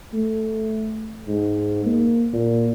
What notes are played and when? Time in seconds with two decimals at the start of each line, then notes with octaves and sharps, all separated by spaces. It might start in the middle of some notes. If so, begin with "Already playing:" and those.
0.13 A3
1.27 G#2
1.85 A#3
2.33 A#2